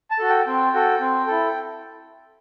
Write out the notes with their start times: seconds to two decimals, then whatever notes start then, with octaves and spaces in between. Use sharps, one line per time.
0.11 A5
0.19 F#4 A4
0.29 G5
0.46 C4 G5
0.74 F#4 A4
1.01 C4
1.27 E4 A4